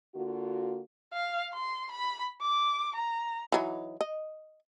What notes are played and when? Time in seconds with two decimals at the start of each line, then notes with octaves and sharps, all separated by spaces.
0.14 D3 A#3 F4 F#4
1.14 F5
1.54 C6
1.91 B5
2.41 D6
2.96 A#5
3.52 E3 F#3 D#4
4.01 D#5